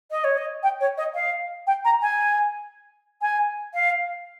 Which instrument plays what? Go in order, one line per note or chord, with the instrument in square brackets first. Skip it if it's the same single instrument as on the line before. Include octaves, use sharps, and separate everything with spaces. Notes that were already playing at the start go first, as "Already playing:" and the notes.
[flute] D#5
C#5
D#5
G5
C#5
D#5
F5
G5
A#5
G#5
G#5
F5